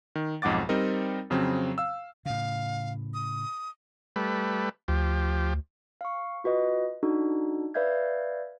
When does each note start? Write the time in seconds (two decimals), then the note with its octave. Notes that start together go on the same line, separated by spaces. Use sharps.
0.15 D#3
0.42 B1 F2 G#2 F#5 D6 A6
0.69 G3 C4 D#4 A#4 D#5
1.30 F2 C#3 F#3 C4
1.78 F5 E6
2.26 A2 C#3 F5
3.14 D#6
4.16 G3 A3 B4
4.88 D2 F3 G4
6.01 F5 C#6
6.44 F4 F#4 B4 D#5
7.03 D4 D#4 F#4 A4
7.74 B4 D5 E5 F5 G6 G#6